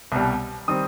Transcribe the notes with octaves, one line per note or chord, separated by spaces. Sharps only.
C2 B2 G3
D#3 G3 C4 D#6